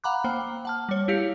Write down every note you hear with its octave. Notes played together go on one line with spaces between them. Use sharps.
F5 F#5 A#5 B5 D6 F#6
A#3 C5 G5
F#5 A5 F6
G3 C#5
E4 G4 F5 B6 C#7